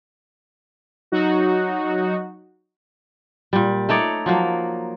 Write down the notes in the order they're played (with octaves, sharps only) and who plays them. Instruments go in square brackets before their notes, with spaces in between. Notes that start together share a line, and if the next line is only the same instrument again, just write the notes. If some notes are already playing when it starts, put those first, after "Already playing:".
[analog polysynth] F#3 D#4 F#4
[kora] A#2 G3
A3 D#4 C#5 D5
F3 F#3 A#3